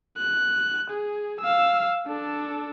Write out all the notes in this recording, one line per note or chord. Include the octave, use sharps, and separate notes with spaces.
F#6
G#4
F5 E6
D4 A4